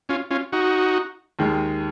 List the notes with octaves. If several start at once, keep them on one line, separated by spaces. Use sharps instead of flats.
C#4 F4
C#4 F4
D#4 F#4
D#2 D#3 G#3